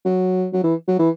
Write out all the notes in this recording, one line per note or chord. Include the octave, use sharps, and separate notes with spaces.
F#3
F#3
E3
F#3
E3